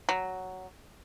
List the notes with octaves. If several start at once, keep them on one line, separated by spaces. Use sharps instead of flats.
F#3